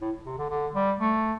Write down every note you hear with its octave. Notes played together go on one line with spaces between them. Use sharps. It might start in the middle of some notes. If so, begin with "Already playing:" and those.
A2
C3
D3
D3
G3
A3